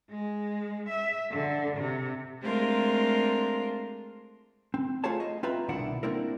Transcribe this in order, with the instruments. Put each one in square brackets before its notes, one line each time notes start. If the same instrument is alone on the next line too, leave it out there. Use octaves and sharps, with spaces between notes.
[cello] G#3
E5
D3
C3
[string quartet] G#3 A3 C4 D4 F4 A#4
[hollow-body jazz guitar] C4
A3 F4 G#4 C5 C#5 A5
D#5
C4 F4 B4 E5 A#5
C2 B2 D#3 D4 E4 F#5
A#3 C4 D4 E4 A#4